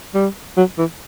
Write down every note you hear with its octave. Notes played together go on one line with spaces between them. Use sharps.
G3
F#3
E3